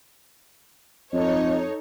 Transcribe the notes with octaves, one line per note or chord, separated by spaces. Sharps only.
F2 D#4 A4 C#5 D#5